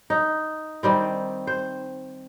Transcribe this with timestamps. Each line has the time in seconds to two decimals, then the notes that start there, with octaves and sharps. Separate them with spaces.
0.10 D#4
0.83 D#3 G3 C4
1.47 C5